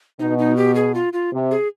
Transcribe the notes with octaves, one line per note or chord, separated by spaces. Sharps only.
B2 D#4
D#4
G4
G#4
F4
F4
C3
G#4